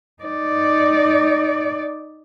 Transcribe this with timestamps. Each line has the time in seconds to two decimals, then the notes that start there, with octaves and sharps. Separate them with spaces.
0.23 D#4 D5